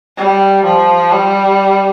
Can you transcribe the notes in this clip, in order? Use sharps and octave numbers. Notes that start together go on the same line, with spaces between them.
G3
F3
G3